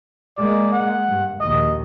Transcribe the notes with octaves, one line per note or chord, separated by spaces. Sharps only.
G#3 A#3 D5
F#5
G2
A#1 D#2 D#5